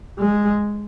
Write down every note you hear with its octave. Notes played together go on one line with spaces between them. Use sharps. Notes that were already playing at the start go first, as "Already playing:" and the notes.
G#3